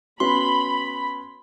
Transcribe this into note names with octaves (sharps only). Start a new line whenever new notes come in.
B3 C#4 F#4 B5 C6